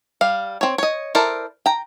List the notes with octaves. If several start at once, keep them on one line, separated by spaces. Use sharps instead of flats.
G3 F5
C4 C#5
C#5 D#5
E4 A4 A#4 C5 D5
G5 A#5